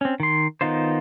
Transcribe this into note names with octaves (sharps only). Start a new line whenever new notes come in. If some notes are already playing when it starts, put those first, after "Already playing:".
C4 C#4
D#3 C6
D#3 B3 D#4 F4 C5